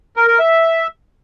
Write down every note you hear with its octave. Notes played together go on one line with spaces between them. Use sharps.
A#4
A#4
E5